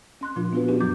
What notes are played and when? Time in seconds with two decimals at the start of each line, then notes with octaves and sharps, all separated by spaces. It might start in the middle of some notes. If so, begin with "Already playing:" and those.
0.21 C#4 C6 F#6
0.36 A#2 F3 D4 F4
0.53 B3 D4 F4 F#4 B4
0.68 C#4 D4 F#4 G4
0.81 F#2 A#2 F3 F#3 D6 G6